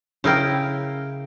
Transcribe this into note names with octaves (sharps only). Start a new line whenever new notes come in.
C#3 E4 A#4 G5